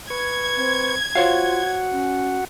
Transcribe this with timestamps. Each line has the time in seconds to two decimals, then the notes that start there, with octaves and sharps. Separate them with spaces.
0.10 B4 C#6 G#6
0.57 C4
1.15 F4 F#4 C5 C#5 F5 F#5
1.92 C#4